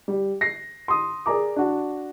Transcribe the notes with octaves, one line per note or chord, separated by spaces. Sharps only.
G3
A#6 C7
C6 D#6
G#4 A#4 D5 A#5 D6
D4 F#4